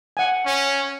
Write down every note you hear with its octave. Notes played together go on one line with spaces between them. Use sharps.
F#5 G#5
C#4